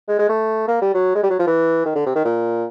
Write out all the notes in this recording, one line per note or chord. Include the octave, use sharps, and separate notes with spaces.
G#3
G#3
A3
A#3
G3
F#3
G#3
G3
F#3
F3
E3
D#3
D3
C3
D#3
A#2